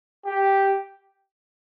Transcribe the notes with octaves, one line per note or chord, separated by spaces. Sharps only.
G4